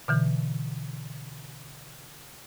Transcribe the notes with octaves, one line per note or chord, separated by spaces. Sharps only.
B2 D3 E3